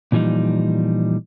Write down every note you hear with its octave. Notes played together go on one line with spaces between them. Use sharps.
A#2 E3 F3 G3 D#4